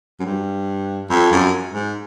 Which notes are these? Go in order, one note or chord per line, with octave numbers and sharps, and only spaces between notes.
F#2
G2
F2
F#2
G#2